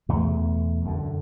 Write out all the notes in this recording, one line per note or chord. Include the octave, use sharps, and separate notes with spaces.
E2 B2 A3
F#2 D3